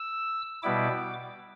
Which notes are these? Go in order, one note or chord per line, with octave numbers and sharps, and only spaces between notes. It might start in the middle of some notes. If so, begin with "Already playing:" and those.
Already playing: E6
B2 G3 B3 E4 D6